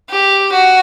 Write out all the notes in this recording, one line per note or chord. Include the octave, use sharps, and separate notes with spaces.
G4
F#4